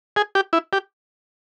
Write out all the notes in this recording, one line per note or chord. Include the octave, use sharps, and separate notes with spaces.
G#4
G4
E4
G4